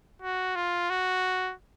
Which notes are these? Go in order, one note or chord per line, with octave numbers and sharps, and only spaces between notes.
F#4
F4
F#4